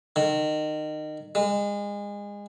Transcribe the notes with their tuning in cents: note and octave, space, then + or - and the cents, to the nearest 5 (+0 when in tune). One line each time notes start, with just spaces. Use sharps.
D#3 -25
G#3 -30